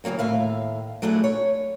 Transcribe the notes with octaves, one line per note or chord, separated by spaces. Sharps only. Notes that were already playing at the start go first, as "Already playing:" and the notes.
C#3 E3 F#3 A#3 C4
D#2 A2 E5 F5
F#3 A3 D4 E4 G#4
C#5